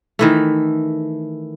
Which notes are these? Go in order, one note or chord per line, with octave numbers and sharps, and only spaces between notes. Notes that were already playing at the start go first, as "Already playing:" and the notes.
D#3 E3 A3